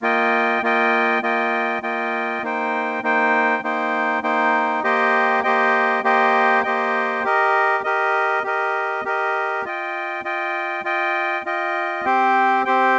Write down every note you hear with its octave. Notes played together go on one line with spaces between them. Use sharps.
A#3 F4 D#5 G5
A#3 F4 D#5 G5
A#3 F4 D#5 G5
A#3 F4 D#5 G5
A#3 D#4 C5 G5
A#3 D#4 C5 G5
A#3 D#4 C5 G5
A#3 D#4 C5 G5
A#3 G4 C5 D#5 G5
A#3 G4 C5 D#5 G5
A#3 G4 C5 D#5 G5
A#3 G4 C5 D#5 G5
G4 A#4 D#5
G4 A#4 D#5
G4 A#4 D#5
G4 A#4 D#5
F4 D#5 G5
F4 D#5 G5
F4 D#5 G5
F4 D#5 G5
C4 G4 C5 G5
C4 G4 C5 G5